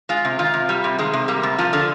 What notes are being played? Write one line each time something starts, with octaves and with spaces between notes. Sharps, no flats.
G#3 F4
C3
D#3 F4
C3
G3
C3
D#3 G#3
C3
G3 A#3
C3
F3 F4
D3